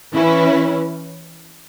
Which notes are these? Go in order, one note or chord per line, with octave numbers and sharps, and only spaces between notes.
E3 C#4 E4 B4